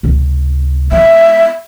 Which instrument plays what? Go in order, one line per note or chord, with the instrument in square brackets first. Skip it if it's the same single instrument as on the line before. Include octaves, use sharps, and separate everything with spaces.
[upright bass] C#2 C3
[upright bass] G#3 B3 [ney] E5